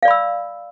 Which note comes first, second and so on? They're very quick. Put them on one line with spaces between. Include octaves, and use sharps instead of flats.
F5 D5 B5 E6